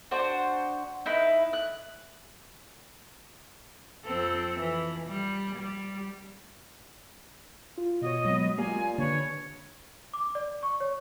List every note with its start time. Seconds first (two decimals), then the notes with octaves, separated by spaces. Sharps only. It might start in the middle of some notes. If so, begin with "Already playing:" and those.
0.11 D4 F#4 C5
1.06 D#4 E4 B4
1.53 F#6
4.05 F2 C4 A4
4.60 E3
5.08 G3
5.56 G3
7.78 F4
8.01 B2 F#4 C#5 D#5
8.25 F#3 G#3 B3 C4
8.58 A#3 F4 G4 D5 G#5
8.98 D3 D4 B4 C#5
10.14 D6
10.35 D5
10.63 C#6
10.80 C#5